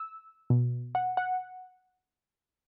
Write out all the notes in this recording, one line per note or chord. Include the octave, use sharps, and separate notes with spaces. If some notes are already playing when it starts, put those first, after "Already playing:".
Already playing: E6
B2
F#5
F#5